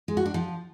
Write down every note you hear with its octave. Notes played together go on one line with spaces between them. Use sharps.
G#3
F#4
D4
F3